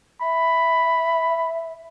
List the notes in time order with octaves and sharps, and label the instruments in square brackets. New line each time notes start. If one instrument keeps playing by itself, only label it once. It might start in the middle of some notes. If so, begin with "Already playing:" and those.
[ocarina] E5 [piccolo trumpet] B5